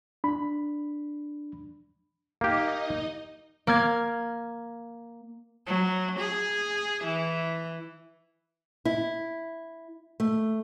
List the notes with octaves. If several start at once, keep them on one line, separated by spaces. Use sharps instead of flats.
D4 B5
A#3 D#4 G4 D#5
A#3 F6 G#6
F#3
G#4
E3
E4
A3